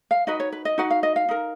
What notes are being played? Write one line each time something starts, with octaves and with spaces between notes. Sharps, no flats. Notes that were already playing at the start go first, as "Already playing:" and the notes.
F5
D#4 F#4 B4 D#5
C#5
B4
D#5
D#4 F#4 B4 F#5
F5
D#5
F5
D#4 A#4